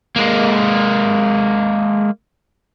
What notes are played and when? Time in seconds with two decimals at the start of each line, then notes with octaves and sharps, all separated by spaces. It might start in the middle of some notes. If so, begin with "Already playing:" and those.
0.16 G#3 A#3